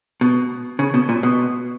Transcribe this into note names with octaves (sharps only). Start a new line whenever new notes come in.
B2
C#3
B2
A#2
B2